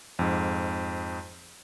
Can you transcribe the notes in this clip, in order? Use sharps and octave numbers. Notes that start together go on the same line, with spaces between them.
F2 G#2